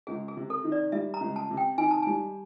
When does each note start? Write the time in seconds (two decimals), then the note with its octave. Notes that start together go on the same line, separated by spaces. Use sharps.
0.07 C#2 G#4
0.28 G#4
0.37 C3
0.50 A4
0.64 D#3
0.72 D5
0.92 G3 E5
1.14 A#5
1.21 C#2
1.36 A5
1.50 C3
1.57 G5
1.78 D#3 G#5
1.91 A5
2.03 G3 G#5